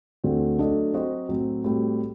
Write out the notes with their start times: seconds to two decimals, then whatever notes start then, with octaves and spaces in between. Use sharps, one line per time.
0.24 D2 D3 A3 C4 F#4
0.59 F#3 A3 D4 A4 D#5
0.93 F#3 C4 F#4 C5 D#5
1.29 A2 F#3 C4
1.64 A2 G3 C4 F#4